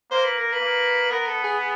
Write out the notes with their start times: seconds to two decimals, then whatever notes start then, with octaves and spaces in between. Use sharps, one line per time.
0.11 A#3 C5
0.25 B4
0.38 A#4
0.52 B4
0.60 A#3
1.10 B3 A#4
1.27 A4
1.43 G#4
1.59 G#4